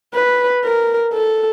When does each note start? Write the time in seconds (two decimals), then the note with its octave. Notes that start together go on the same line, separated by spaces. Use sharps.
0.15 B4
0.64 A#4
1.13 A4